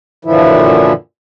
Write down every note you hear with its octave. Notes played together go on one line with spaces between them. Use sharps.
F#2 A#2 D3 E3 F3 E4